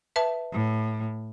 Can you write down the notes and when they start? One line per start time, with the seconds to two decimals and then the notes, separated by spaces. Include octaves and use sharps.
0.16 B4 E5 A5
0.52 A2